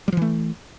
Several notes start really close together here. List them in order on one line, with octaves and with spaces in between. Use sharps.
G3 F3 E3 A3